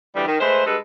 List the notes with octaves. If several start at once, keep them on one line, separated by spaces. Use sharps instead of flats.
D2 E3 G3
D#3
G#3 A3 B4 C5
G2 G#3 A4 B4